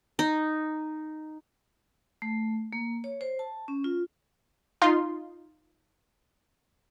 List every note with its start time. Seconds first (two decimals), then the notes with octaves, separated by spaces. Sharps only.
0.19 D#4
2.22 A3
2.73 A#3
3.04 C#5
3.21 C5
3.39 A5
3.68 C#4
3.84 F4
4.82 D#4 F4 C6